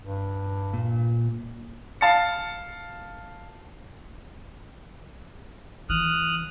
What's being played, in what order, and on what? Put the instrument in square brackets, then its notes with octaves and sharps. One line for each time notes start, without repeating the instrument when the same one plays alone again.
[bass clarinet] G2
[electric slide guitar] A#2
[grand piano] F5 A5 A6 C#7
[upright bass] E3 [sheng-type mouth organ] D#6 F6 F#6